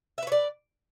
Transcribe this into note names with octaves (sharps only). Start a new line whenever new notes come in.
B4 C#5 D5 E5